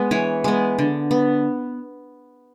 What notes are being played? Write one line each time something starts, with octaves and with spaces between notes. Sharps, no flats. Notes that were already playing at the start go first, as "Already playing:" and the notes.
Already playing: G#3 B3
E3 C#5
G#3 B3
D3
B3